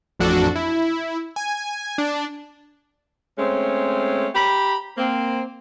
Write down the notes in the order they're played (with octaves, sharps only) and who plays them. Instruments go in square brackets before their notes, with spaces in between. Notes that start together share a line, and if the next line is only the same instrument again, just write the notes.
[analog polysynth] A1 F2 D4 F#4 A4
E4
G#5
D4
[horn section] G#3 A3 C4 C#4
G4 A#5 B5
A#3 C4